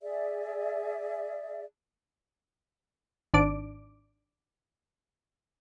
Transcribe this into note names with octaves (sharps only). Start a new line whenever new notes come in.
G#4 D5 E5
G#1 D4 D6